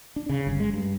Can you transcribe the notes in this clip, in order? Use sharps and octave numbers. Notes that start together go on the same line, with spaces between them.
D4
C#3
G1
G#3
G2